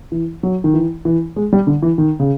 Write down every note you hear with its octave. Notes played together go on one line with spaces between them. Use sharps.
E3
F#3
D#3
E3
E3
G#3
G3
D3
E3
D#3
C#3